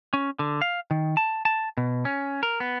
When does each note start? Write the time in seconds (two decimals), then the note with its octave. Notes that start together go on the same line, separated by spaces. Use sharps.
0.14 C#4
0.39 D3
0.61 F5
0.91 D#3
1.17 A5
1.45 A5
1.77 B2
2.05 C#4
2.43 A#4
2.60 B3